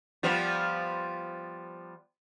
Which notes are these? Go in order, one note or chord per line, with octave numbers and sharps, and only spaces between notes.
F3 G3 B3